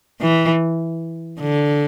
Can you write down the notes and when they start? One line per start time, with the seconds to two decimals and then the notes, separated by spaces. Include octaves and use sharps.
0.20 E3
1.40 D3